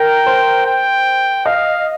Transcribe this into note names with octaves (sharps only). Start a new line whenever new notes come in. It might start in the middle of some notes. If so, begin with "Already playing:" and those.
Already playing: A#4 G5
C5
G5
D#5 F5